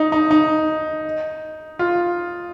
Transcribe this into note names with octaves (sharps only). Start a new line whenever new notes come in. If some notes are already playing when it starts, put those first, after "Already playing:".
Already playing: D#4
D#4
D#4
F4